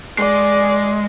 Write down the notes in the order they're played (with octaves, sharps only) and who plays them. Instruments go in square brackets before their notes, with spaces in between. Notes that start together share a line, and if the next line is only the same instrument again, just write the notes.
[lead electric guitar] G#3 [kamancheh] D5